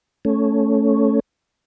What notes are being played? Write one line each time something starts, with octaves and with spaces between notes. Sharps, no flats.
A3 C#4